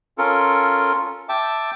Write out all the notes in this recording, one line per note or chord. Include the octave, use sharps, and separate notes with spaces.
C#4 F4 A4 A#4
E5 G5 A5 D6